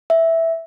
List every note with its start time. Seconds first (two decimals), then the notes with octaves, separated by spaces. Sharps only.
0.10 E5